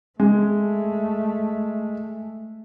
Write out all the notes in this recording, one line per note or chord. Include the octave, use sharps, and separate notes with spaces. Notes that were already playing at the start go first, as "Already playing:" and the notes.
G#3 A3